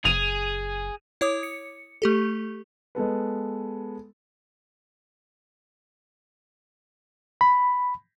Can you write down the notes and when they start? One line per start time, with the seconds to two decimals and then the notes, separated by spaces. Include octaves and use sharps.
0.05 F#1 G#4 D#7 F7
1.21 E4 C#5 D6 D#6
1.43 C#7
2.02 A3 G4 A4
2.95 G#3 B3 A4 B4
7.41 B5